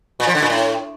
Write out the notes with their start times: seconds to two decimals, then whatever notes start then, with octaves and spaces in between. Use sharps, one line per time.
0.20 A#2
0.27 F3
0.35 D3
0.42 A#2
0.50 A2